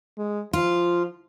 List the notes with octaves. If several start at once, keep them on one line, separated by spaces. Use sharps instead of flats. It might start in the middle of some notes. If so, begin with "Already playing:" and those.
G#3
F3 F4